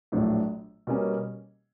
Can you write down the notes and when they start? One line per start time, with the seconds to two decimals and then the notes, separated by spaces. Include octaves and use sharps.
0.12 A#1 A2 F#3 A3 D4
0.87 B2 G3 A#3 C#4